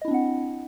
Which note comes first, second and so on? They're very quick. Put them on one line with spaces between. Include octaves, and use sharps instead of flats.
D#5 E4 D4 C4 F#5